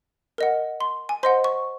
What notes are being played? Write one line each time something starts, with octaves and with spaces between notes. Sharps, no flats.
A#4 D#5 F#5
C6
G#5
C5 D#5 F#5 C6
C#6